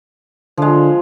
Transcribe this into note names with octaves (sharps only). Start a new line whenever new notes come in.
D3 F3 G#3